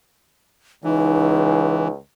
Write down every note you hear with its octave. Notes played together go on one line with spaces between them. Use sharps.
C#2 E3 D#4